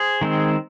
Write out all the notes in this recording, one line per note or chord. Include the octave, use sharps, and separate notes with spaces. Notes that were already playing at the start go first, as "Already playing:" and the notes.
Already playing: G#4 C5
D#3 G#3 C4